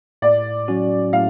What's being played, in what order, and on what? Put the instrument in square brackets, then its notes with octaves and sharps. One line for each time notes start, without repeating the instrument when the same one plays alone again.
[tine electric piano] A2 [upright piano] D5
[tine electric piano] F#3 C#4 F#4
[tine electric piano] A2 [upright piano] F5